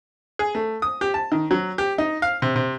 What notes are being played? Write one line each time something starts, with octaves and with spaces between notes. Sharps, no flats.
G#4
A3
D#6
G4
A5
D#3
F#3
G4
D#4
F5
C3
C3